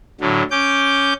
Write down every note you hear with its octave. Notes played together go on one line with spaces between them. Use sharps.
A2 D3 F#3
C#4 D6 G6